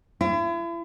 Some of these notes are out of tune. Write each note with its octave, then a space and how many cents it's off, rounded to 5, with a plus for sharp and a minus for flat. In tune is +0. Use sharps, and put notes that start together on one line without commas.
E4 +40